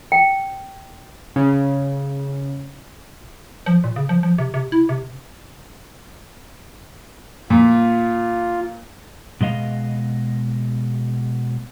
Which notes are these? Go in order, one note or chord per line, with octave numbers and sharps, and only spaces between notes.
G5
C#3
F3
A#2
C#3
F3
F3
C3
C3
E4
C3
A#2 F4
B2 G#3 D#5 F5